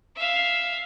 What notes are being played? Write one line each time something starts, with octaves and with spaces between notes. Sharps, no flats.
E5 F5